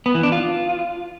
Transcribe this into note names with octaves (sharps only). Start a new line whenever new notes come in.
B3
E3
D4
F4